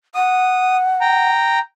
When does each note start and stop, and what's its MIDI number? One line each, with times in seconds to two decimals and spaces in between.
0.15 1.30 78
0.15 0.77 87
1.01 1.59 79
1.01 1.59 82